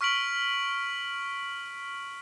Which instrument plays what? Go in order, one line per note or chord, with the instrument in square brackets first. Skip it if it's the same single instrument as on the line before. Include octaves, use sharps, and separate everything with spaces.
[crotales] C#6 F6 B6 D7 F#7